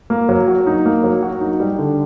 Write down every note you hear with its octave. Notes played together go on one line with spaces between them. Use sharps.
A#3
F#3
F#4
D#4
A#3
F#3
F#4
D#4
G3
D3